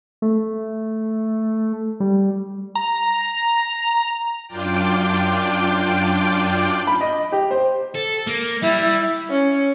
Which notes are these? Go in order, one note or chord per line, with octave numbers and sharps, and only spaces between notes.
A3
G3
A#5
F#2 D4 F4 D5 G5
B5
D#5
G4
C5
A4
A#3
G3 E4
C#4